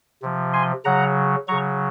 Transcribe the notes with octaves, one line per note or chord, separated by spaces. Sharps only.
C3 F3
G#5 C6
C#3 F#3 F#5 A#5
C#3 F#3 A#5 C#6